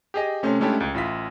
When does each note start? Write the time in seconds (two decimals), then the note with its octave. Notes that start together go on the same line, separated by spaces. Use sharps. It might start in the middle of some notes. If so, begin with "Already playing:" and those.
0.14 G4 G#4 D#5
0.43 C3 A3 C#4 C5
0.60 G#3 A3 C#4 D4 E4 G4
0.80 C#2
0.94 A1 E4 F4 B6